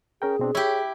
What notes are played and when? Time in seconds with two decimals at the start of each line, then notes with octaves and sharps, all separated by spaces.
0.22 C#4 G#4 A#4 G5
0.39 B2 C4 D4
0.55 E4 G4 C#5